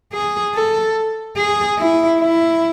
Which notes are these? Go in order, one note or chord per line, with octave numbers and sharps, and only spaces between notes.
G#4
A4
G#4
E4
E4